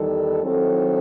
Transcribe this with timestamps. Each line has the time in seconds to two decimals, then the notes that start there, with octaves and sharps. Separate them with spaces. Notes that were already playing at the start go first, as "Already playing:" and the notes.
Already playing: E2 D#3 G3 D#4 A4
0.42 D#3 F#3 C4 E4 A4